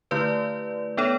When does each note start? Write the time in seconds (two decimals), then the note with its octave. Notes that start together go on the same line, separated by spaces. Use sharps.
0.11 D3 A3 E4 B4 D5
0.97 B3 D4 A4 C#5